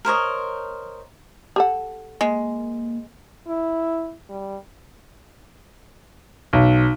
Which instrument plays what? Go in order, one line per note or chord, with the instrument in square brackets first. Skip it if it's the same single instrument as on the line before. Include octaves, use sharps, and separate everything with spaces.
[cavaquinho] A#4 C5 C#5 D#5
[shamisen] G4 A4 F#5
[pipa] G#3 [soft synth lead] A#3
[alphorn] E4
G3
[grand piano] B1